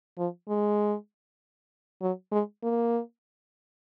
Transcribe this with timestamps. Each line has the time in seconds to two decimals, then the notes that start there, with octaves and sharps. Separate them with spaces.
0.18 F3
0.49 G#3
2.02 F#3
2.32 G#3
2.63 A#3